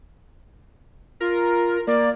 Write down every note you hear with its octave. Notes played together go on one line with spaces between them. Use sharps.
F4 A#4
A#3 D5